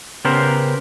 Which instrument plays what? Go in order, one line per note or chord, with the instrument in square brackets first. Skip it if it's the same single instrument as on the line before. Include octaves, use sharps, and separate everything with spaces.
[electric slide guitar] C#3 B3 G4 A#4 C5